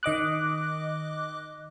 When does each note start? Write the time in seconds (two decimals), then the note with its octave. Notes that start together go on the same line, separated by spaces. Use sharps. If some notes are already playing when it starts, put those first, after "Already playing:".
0.03 D#3 D#5 D6 F#6